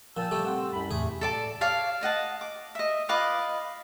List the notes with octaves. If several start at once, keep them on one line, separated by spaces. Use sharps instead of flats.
A#2 F3 G5 A5 E6
G3 A3
C4 F#5
C2 F#2 B5
E2 A2 C3 A3 G#4
A4 D5 A5
C#5 D5 F5 A5
D5 D#5 F#5 A5
D6
D#5 E5
F4 B4 D#5 D6